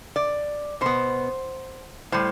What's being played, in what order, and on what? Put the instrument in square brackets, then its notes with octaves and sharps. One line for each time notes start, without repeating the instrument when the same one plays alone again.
[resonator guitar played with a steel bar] D5
B2 B3 C5
A2 G3 C5